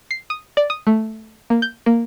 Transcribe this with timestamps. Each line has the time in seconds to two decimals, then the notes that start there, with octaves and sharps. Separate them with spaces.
0.11 C7
0.30 D#6
0.57 D5
0.70 D#6
0.87 A3
1.50 A#3
1.62 G6
1.86 A#3